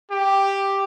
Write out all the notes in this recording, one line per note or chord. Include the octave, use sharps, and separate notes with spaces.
G4